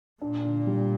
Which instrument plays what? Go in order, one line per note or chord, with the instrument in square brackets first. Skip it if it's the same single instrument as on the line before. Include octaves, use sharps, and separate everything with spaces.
[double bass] A#2 [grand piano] D4
[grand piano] D3
G3